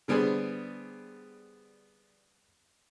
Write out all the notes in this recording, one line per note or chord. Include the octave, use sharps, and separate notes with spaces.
D3 G3 B3 G#4 C5